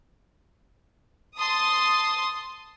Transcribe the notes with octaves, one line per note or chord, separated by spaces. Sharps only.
A5 C6 D#6